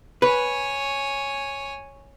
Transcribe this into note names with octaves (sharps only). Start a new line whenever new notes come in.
B4 C#5 G#5